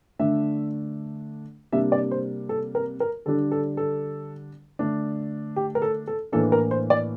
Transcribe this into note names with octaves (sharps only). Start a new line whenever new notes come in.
D3 A3 D4 E5
C3 G3 A#3 D4 E5
D5
C5
A4
A#4
A#4
D3 G3 D4 A4
A4
A4
D3 A3 D4
G4
A#4
A4
A4
A2 E3 A#3 D4 A4
A#4
C5
D5